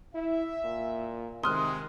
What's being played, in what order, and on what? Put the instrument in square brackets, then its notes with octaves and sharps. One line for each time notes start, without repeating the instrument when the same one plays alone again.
[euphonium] E4 [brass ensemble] E5
[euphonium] A#2
[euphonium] C3 [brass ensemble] D#3 G#3 [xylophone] C6 F6 F#6 [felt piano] D#6